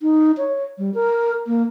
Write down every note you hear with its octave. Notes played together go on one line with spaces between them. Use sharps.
D#4
C#5
G3
A#4
A#3